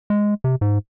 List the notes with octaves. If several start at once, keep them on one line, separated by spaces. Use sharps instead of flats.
G#3
C3
G#2